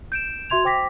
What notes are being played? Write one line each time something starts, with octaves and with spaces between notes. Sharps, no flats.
G6 D7 E7
F#4 E5 C6 G#6 F7
C5 G5 D6 A#6 B6